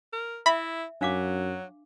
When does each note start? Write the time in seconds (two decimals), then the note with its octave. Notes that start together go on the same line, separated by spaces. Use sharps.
0.13 A#4
0.46 E4 E5 B5
1.01 F#2 F#3 D4 F5 D6